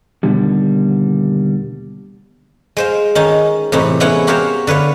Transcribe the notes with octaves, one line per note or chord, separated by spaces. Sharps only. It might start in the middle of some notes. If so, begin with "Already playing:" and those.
D#2 B2 D3 G3
G#3 C5 F5
D#3 C#4 D#4
A2 C3 E3 D#4
G#3 B3 C#4 E4 F#5
F#4 G4 A#4 C5 C#5 F5
D3 B4 C#5 F5